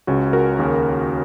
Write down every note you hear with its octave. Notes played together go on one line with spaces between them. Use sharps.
C#2 C#3 C#4 F#4
F#4 A#4
D#2 C#3